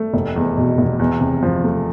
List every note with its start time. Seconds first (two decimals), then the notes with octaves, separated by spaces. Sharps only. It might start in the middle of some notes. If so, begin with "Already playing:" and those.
Already playing: A3
0.14 F1
0.36 E2
0.57 B2
0.78 F1
0.99 E2
1.21 C3
1.43 F3
1.64 A3